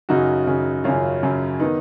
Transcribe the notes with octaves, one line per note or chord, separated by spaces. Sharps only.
F#2 C#3 D#4 F#4
F#2 C#3
F#2 C#3 C#4 F4
F#2 C#3
D#3 B3 D#4